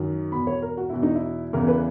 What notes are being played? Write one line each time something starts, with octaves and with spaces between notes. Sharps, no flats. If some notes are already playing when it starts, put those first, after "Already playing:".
Already playing: F#2 D#3
E2 B2 B5
C#5
A#4
F#4
E2 B2 E4
D#4
E4
E2 C#3 E3 A#4
B4